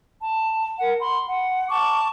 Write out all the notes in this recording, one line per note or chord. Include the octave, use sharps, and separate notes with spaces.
A5
A#4 F#5
B5 C6
F#5
A5 C#6 D6